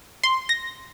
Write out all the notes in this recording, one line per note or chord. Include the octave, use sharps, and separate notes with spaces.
C6
A#6